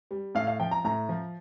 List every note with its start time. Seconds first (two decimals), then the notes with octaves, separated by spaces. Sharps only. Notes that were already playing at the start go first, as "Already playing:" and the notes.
0.11 G3
0.35 A2 F5
0.47 F5
0.60 F3 G5
0.71 A#5
0.84 A2 A#5
1.09 F3